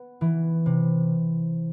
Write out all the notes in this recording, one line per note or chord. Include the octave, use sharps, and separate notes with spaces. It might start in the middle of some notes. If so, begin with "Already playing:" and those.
Already playing: B3
E3
C3